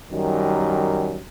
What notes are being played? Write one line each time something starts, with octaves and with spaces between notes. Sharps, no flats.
F#2 D#3 G3